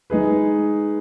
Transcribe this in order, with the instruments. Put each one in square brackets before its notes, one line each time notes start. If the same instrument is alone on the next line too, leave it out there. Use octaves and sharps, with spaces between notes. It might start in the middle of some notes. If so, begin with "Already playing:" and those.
[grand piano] G#3 D#4 G#4 B4